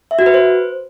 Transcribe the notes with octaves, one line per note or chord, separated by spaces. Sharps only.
E5
F#4
B4
C5